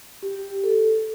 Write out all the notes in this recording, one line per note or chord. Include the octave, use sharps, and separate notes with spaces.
G4
A4